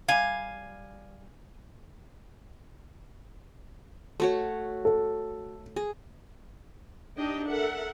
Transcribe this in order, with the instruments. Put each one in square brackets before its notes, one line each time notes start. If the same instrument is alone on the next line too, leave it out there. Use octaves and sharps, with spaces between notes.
[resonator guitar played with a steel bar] G3 F5 [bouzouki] G#5
[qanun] A3 F#4 C#5
[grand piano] A4
[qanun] G#4
[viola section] D4 D#4 G4 D#5 G5
A4 A#4 E5 F#5